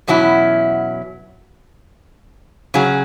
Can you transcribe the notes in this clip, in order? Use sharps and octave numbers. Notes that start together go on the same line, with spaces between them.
E2 B2 F#3 C#4 E4
C#3 F#3 C#4 G#4